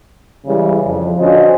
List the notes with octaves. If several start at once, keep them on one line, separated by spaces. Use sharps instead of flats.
C#3 E3 G3 G#3
F2
D3 C#4 F4 F#4 C5 D#5